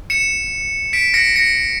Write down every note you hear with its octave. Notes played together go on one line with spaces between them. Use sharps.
C#7 E7
B6 D7
A#6 C#7
A#6 C#7